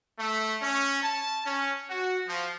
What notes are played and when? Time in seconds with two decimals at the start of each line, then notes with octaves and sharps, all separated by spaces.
0.20 A3
0.62 C#4
1.03 A5
1.45 C#4
1.90 F#4
2.28 F3